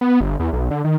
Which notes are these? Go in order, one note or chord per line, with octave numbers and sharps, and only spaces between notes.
B3
G1
E2
B1
D3
D#3